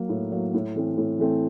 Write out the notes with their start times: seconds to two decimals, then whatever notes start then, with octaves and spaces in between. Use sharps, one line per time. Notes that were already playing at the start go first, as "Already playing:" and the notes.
Already playing: F#3 A#3
0.09 A2
0.32 F#3 A#3
0.54 A2
0.76 E3 A3 C4
0.98 A2
1.19 E3 A3 C4